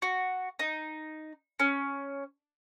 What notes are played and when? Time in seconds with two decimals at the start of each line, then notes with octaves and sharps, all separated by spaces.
0.02 F#4
0.59 D#4
1.59 C#4